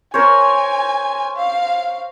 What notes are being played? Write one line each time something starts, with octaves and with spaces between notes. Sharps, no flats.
A#4 C5 C#5 G#5
F5